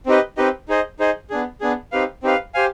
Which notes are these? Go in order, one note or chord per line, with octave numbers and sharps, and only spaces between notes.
C4 D#4 G4 B4 D#5
C4 D#4 G4 B4 D#5
D#4 G#4 C5 D#5
D#4 G#4 C5 D#5
B3 D4 G#4
B3 D4 G#4
C4 D#4 G4 B4 F5
C4 D#4 G4 B4 F5
G4 C5 F5 G#5